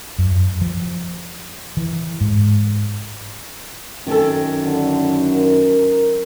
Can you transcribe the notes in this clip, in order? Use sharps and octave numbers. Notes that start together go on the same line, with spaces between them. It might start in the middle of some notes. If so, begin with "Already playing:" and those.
F#2
F3
E3
G#2
F#2 D#3 C#4 A4
D3
A#4